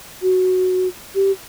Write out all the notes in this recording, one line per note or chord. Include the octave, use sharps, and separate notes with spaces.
F#4
G4